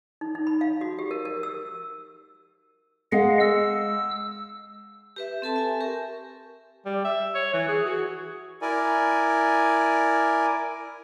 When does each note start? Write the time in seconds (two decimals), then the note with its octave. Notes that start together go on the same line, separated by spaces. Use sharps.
0.21 D#4
0.35 D#4
0.47 B5
0.61 F5
0.81 F#4
0.99 G4
1.11 A#4
1.25 A#4
1.43 E6
3.12 G#3 D#5 F5 F#5
3.40 E6
5.16 G4 B4 E5
5.42 C4 A4 A5 C6
5.56 E5 G#5
5.81 G4 A#4 C#6
6.85 G3
7.05 E5
7.35 C#5
7.53 E3
7.68 G#4
7.85 F#4
8.62 E4 A#4 D5 G#5